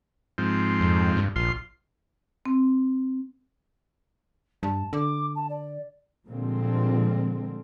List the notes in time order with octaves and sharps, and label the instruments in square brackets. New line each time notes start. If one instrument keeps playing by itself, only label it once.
[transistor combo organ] G#2 F3 C4
[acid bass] F2
G2
[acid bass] A#1 [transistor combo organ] F4 C6
[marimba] C4
[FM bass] G2 [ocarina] A5
[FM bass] D3 [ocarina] D6
[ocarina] A5
D5
[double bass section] A#2 D3 F3 G3 G#3 C4